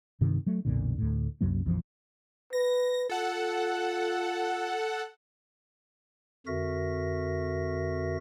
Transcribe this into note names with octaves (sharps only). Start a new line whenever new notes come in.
G2 C3 D#3
F#3 A3
B1 F2 A#2 D3
D2 A2
C2 F#2 F#3 A#3
A#1 F2 E3 F3
B4 A#6
F4 A4 F#5
F2 D3 F#4 A#4 E5 A#6